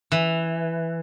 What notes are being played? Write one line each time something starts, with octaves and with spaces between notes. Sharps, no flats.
E3